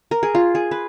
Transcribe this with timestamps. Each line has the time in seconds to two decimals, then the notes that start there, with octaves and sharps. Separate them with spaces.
0.11 A#4
0.23 G#4
0.35 F4
0.55 G#4
0.71 B4